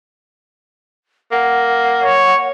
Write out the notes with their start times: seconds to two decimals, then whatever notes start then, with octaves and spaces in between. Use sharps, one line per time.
1.32 A#3 F#5
2.03 C#5